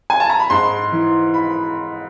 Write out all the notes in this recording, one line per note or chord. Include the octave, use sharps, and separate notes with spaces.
G#5
A5
A#5
B5
G#2 C6
E3
B5